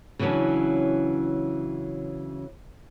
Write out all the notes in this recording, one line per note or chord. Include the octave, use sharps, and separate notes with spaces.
C#3 E3 F#3 C#4 D4